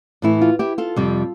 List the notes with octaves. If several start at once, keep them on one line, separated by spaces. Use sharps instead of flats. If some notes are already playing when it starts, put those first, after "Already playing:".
A2 E3 A3 E4
F4
E4 G4
F4 A4
F2 C3 G3